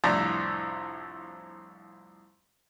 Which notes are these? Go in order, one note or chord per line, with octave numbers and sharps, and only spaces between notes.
C2 F2 A2 D4